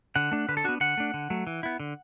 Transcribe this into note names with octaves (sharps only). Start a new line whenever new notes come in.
D3 F#5
A3 D4
D3 B4
A4
B3 D4 F#4
D3 F#5
A3 D4
D3
F#3 A3
E3
B3 E4
D3